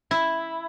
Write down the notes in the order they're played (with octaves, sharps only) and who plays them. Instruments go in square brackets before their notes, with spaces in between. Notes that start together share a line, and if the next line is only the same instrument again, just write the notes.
[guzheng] E4